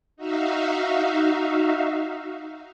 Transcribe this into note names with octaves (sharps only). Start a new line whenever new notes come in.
D#4 F#4 E5 F5